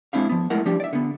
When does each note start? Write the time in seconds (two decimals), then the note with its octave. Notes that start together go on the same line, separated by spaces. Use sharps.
0.13 G#3 C4 D4 E4 F5
0.29 F3 B3
0.50 G#3 A3 E4 A#4 F#5
0.66 F3 G3 D4 G4
0.80 D5 E5
0.93 D3 B3